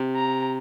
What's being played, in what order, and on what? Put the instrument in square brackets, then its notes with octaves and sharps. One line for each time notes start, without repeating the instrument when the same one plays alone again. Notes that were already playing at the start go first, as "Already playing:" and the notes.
Already playing: [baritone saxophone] C3
[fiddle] A#5